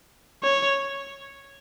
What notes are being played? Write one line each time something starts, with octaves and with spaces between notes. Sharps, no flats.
C#5